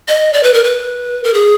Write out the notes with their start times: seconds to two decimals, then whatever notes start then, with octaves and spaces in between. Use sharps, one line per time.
0.08 D#5
0.33 D5
0.43 B4
0.54 A#4
0.64 B4
1.24 A#4
1.34 G#4